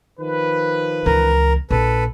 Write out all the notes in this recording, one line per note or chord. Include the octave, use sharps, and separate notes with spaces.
D#3 F3 B4
C#2 E3 A#4
A#1 A#3 A4 B4